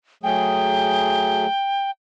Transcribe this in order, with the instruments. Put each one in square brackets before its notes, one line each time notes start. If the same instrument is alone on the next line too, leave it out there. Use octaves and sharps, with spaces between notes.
[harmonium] F#3 A3 G#4 [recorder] G5